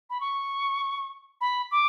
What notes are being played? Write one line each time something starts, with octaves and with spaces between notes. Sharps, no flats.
B5
C#6
B5
D6